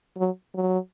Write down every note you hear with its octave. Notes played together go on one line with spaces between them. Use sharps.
F#3
F#3